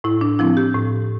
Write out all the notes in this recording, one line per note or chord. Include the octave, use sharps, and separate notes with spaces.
A2 E4
D4
F3 C4 E4
G4
A2